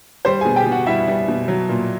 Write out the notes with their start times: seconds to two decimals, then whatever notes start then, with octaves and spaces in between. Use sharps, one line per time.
0.25 G3 C5 C6
0.41 B2 G#4 G#5
0.56 G4 G5
0.66 B2
0.71 F#4 F#5
0.86 G3 E4 E5
1.08 G3
1.28 B2
1.48 F#3
1.69 A#2